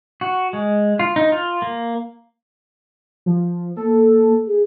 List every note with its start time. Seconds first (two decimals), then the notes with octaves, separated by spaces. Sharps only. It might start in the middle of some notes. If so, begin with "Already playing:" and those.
0.21 F#4
0.53 G#3
0.99 F4
1.16 D#4
1.32 F4
1.62 A#3
3.26 F3
3.77 A#3 A4
4.47 G#4